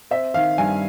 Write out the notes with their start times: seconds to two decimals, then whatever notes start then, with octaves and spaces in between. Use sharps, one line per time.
0.11 C4 E5
0.34 D#3 F5
0.58 G2 G#5